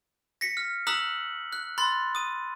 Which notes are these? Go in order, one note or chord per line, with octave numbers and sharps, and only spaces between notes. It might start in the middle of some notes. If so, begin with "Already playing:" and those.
A#6 B6 C#7
F6
A#5 D#6 E6 F#6 B6 F#7
F#6
B5 C6 F#6 A6
D#6 D#7